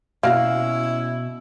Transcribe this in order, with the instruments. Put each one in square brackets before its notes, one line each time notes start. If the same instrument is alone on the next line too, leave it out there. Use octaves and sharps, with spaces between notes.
[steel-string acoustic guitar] B2 [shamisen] A#3 F#4 A#5 [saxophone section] C#4 E4 [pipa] F5